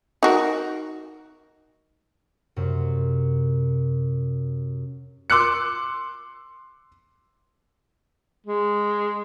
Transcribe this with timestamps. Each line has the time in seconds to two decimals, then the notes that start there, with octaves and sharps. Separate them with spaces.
0.23 D#4 F#4 A#4
2.56 F#2 C3
5.30 C6 D6 E6 F#6 C#7
8.47 G#3